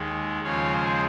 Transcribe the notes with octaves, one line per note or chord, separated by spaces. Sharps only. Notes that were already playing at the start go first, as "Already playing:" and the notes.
Already playing: D#2 D#3 G#3
D#2 C#3 F3 G#3 C#5 F5
G#4 C5